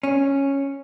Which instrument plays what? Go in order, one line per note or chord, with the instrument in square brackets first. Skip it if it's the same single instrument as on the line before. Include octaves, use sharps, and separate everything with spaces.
[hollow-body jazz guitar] C#4